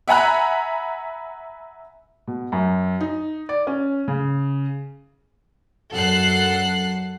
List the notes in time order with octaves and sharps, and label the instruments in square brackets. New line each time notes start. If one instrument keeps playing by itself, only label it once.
[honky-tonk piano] E5 F#5 G#5 A#5 B5 F#6
[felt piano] B2
F#2
D#4
D5
C#4
C#3
[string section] F#2 A4 F#5 F#6 C7